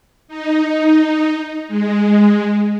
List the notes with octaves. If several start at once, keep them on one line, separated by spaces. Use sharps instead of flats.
D#4
G#3